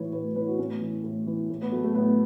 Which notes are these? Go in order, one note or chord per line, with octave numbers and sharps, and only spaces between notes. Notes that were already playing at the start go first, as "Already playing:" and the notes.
Already playing: A2 E3 B4 C#5
A2 B4
E3 B4
F#4
A2 C#4
E3
A2
E3
A2
B3
F#3 A3
A3
A2 B3